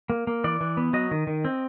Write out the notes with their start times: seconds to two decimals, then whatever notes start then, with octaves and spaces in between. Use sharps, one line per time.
0.10 A#3
0.27 A#3
0.44 E3 D5
0.61 E3
0.77 B3
0.93 F#3 D#5
1.11 D#3
1.27 D#3
1.45 C4